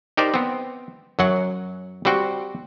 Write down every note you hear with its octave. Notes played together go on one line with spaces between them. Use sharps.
D#4 G4 A#4 C5 D5
B3 C4
F#2 F#3 F#5
G3 C4 F#4 G5